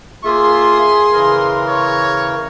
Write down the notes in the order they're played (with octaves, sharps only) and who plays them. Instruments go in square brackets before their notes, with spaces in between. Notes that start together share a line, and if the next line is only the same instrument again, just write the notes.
[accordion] A#3 F4 E5 [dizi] G#4 [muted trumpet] C6
[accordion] C#3 E3 A#4
[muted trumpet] C#5